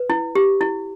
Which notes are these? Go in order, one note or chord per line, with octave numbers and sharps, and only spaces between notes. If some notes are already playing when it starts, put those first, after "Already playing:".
Already playing: B4
E4
G4
E4